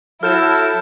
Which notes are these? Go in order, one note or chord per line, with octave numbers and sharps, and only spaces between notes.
F#3 E4 A4 F6 G6 E7